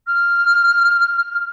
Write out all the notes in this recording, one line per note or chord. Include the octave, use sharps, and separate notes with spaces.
F6